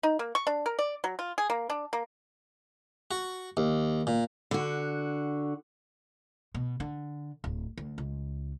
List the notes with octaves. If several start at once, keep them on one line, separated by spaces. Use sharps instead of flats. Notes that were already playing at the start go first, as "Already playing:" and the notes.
D#4
A#3
C#6
D4
A#4
D5
F#3
F4
G#4
A#3
D4
A#3
F#4
D#2
A#2
D3 F#4
B2
D3
D1
D2
C#2